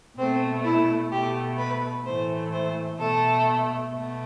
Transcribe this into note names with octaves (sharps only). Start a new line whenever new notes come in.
B2 A3 C4
E4
B2 A3 G4
B4
A2 E3 A3 C5
C5
B2 A3 A4
B2 A3